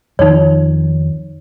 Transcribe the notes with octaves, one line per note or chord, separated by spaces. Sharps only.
F2 D#3 F3 D#4 C#5